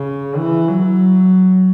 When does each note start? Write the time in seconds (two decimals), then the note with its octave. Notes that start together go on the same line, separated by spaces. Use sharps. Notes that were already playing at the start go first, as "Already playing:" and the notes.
Already playing: C#3
0.37 E3
0.69 F#3